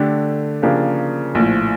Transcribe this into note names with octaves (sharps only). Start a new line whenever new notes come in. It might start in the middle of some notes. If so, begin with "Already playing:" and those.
Already playing: D3 A3 D4 G4
C#3 F3 A#3 D4 G4
A#1 A2 F3